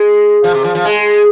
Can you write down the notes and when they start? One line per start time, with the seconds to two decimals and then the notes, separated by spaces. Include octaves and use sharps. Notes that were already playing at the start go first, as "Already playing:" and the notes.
Already playing: G#3
0.44 F3
0.54 C3
0.64 F3
0.75 F3
0.85 G#3